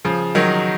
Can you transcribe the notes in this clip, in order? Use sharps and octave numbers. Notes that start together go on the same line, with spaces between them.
C#3 F3
D#3 F#3